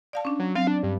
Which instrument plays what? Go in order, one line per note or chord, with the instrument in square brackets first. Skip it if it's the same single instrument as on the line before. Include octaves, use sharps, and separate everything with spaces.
[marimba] D5 F5 A5
C#4 D4
[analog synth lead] F#3
[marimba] F#3 C4 [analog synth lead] F5
[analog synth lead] D4
G2